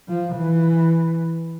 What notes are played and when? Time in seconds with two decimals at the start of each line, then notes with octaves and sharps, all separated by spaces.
0.08 F3
0.35 E3